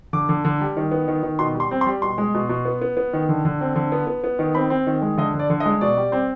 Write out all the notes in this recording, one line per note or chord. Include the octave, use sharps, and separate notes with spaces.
D3 D6
D3
D3
G3
D#3
B3
D#3
D#3
B2 C6
G3
C6
C4
C6
G3
B2 C6
G#3
B2
B2
B3
B3
B3
D#3
D3
D3
C4
D3
B3
B3
B3
D#3
C4 B5
C4
D#3
G#3
D3 D#5
D3
D5
D3
D#5
G#3
B2 D5
G3
C4